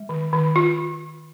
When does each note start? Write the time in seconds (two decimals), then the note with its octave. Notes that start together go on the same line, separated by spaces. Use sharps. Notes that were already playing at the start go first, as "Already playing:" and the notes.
Already playing: G#3
0.09 D#3
0.33 D#3
0.56 D#3 F4